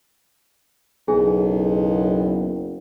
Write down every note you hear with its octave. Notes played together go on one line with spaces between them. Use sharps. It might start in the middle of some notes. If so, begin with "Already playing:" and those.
F#1 B1 G#4 G#5